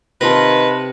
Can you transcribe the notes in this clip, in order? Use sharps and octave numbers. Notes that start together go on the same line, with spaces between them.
C3 D#3 F4 B4 G5 A5 C6 A#6